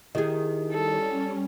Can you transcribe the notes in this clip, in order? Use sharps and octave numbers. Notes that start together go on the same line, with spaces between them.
D#3 E4 G4 G#4 D#5
G3 C#4 A4